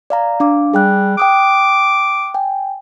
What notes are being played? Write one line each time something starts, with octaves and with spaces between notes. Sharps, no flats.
D5 F5 A#5
D4 F5 D6
G3 G#4 G5 F#6
G5 D6 D#6 F#6
G5 G#5